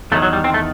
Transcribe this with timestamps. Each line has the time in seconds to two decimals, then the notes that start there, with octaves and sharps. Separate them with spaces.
0.12 E2 D#3 F#3 A3
0.22 F#3
0.33 G3
0.44 C4
0.54 A3